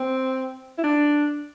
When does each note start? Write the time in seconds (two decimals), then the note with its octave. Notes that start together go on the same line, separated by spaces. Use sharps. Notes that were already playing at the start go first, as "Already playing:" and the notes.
Already playing: C4
0.78 E4
0.83 D4